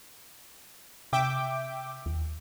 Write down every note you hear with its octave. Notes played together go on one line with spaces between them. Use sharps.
C3 E5 G5 D6
D#2